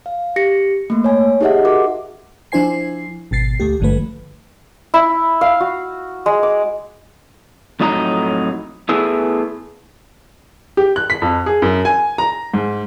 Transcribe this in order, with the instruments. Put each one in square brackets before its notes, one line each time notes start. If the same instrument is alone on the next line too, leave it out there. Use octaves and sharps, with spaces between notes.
[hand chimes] F5
G4 A#6 C#7
A3 A#3
C#5 G#5
D#4 G4 G#4 D#5 E5 F#5
F#4 A#4 F#5 D6
[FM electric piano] F3 D4 E4 C5 G#5 C7
G#1 B2 A6 C7
D2 A3 G4
G#1 G2 D3 F3 A3 B4
[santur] E4
F5
F#4
G#3
D6
[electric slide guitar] F2 A2 F#3 D#4 F#4 A#5
A3 B3 E4 G#4
[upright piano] G4
F#6
B6
F2
G#4
F#2
G#5
A#5
G#2